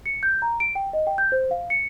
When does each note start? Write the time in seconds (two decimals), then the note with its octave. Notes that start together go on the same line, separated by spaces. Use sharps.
0.06 C#7
0.23 G6
0.42 A#5
0.60 D7
0.75 G5
0.93 D#5
1.07 G5
1.18 G6
1.32 C5
1.51 F5
1.70 C#7